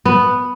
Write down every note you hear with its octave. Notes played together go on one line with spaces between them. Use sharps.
B3